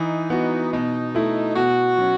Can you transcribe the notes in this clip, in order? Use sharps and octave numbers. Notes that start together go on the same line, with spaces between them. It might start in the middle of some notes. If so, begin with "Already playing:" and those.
Already playing: E3 D#4
B3 F#4
B2 D#4
A3 E4
B2 F#4
F#3 C#4